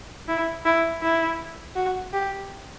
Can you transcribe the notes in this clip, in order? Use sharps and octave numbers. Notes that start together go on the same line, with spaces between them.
E4
E4
E4
F#4
G4